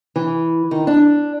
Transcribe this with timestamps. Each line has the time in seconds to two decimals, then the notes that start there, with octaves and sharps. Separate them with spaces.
0.16 E3
0.71 D#3
0.87 D4